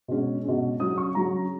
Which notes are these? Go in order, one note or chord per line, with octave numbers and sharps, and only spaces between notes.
B2 G#3 C#4
B2 G#3 C#4
C#3 F#3 C#4 D#6
C#6
C#3 F#3 C#4 A#5